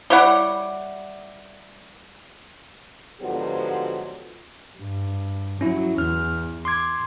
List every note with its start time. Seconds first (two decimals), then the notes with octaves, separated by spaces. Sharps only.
0.10 G3 E4 C#5 F#5
3.21 G#2 D3 F3 F#3 B3 G4
4.76 G2
5.61 F#3 C#4 E4
5.98 E2 F6
6.65 C6 D6 G#6